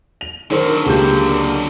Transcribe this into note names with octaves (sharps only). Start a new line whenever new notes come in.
F7
D3 D#3 F#3 A#4 C5
C#2 G#3 A#3 G4 G6